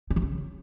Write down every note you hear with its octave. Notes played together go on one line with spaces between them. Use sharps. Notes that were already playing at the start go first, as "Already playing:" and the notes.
G3
D#3
C#3